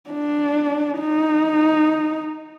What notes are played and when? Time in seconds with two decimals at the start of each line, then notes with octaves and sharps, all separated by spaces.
0.10 D4
0.99 D#4